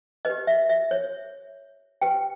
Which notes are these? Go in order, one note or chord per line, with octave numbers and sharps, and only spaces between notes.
G4 B4 D#5
E5
E5
C#5
G4 B4 G5